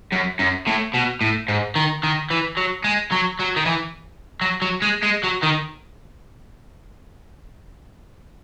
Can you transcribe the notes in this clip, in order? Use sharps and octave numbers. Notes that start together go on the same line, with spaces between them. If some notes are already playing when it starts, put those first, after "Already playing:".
F#2
F#2
A2
B2
A2
G#2
D#3
D#3
E3
F#3
G#3
F#3
F#3
D#3
E3
F#3
F#3
G#3
G#3
F#3
D#3